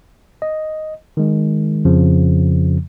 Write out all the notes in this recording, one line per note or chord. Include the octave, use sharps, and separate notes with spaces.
D#5
D#3 G#3
F2 C#3 F3